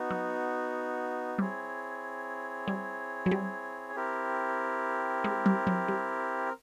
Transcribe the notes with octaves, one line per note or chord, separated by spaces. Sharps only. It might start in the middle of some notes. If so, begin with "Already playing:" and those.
Already playing: B3 D#4 F#4
F#3
G3 C4 E4 G#4 C#5
G3
F#3
G3
C4 E4 G4 A#4
G#3
G3
F#3
G3